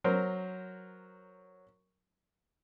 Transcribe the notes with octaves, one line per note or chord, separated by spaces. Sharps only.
F#3 A#4 C5